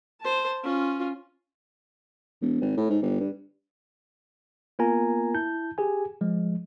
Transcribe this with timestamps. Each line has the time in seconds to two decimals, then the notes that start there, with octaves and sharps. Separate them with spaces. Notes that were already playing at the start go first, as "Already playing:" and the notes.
0.21 C5 A5
0.63 C#4 F4
2.42 E1
2.61 G#1
2.77 A2
2.90 G#2
3.02 G1
3.20 G2
4.79 A#3 B3 F4 A#4 G#5 A#5
5.35 E4 A5 G6
5.78 G4 G#4 G#5
6.21 F3 G#3